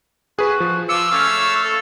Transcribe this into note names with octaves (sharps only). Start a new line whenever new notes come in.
F#4 G#4 B4
F3
F3 F4 D6 E6 C#7
A3 C#4 F5
C#5
A4